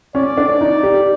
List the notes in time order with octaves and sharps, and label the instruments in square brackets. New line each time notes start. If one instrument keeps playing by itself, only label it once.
[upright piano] C#4 [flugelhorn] D5
[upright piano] D4
D#4
G4